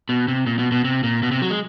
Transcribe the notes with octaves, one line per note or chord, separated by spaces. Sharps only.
B2
C3
A#2
B2
B2
C3
A#2
B2
C3
F#3
G#3